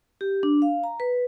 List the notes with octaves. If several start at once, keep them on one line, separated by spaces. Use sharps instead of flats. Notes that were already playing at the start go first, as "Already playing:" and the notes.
G4
D4
F5
A#5
B4